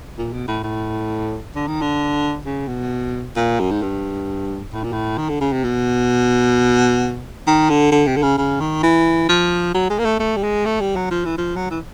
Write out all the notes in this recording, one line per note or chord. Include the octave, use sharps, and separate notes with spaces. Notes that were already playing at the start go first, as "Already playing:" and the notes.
A#2
B2
A2
A2
D3
D#3
D3
C#3
B2
A#2
F#2
G#2
G2
A2
A#2
A2
D#3
D3
C#3
C3
B2
D#3
D3
D3
C3
D3
C#3
C#3
D#3
E3
F3
F#3
G#3
A#3
A3
A3
G3
G#3
A3
G3
F#3
F3
E3
F3
F#3
E3